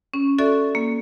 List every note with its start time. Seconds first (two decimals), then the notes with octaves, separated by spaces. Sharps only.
0.14 C#4
0.39 F#4 A4 D5 E5 C#6
0.75 A#3